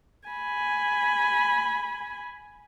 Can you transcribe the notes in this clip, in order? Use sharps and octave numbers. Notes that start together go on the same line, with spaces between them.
G#5 B5